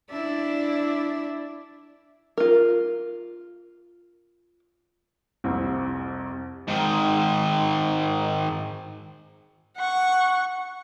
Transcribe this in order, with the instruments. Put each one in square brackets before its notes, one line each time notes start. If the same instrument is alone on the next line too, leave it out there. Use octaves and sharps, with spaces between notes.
[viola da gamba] D4 E4 [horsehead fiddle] D5 E5
[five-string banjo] F4 A#4
[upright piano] C2 F2 C4
[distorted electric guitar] G#2 D#3
[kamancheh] F#5 C#6